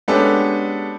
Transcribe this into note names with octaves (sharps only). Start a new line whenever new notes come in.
G#3 B3 C#4 D4 G4 A4